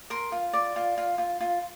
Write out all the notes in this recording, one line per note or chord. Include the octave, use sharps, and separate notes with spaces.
A#4 C6
F4
D5
F4
F4
F4
F4